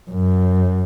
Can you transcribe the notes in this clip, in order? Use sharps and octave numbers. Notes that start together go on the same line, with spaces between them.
F#2